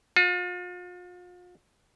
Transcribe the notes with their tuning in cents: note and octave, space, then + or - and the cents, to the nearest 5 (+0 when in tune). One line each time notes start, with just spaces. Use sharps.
F4 +40